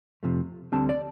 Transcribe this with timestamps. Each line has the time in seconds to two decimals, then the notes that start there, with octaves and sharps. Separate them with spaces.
0.23 F2 C3 F3 A3
0.72 D2 D3 G3 C4 A5
0.89 D5